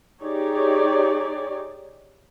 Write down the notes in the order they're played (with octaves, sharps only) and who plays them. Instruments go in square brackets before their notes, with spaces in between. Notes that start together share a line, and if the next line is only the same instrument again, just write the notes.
[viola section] D#4 G4 G#4 C#5 D5